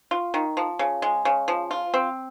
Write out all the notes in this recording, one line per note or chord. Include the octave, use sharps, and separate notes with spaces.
F4
D#3
F3
C#3
G#3
C#3
F3
F4
C4